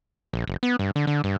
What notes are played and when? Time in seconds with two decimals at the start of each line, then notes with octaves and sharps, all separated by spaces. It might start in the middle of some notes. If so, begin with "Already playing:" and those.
0.33 A#1
0.48 F#1
0.63 B3
0.79 G2
0.96 D3
1.07 D3
1.24 G2